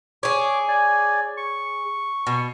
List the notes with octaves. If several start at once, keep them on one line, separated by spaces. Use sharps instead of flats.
G#4 C#5 D6
D5 G#5
C#6
B2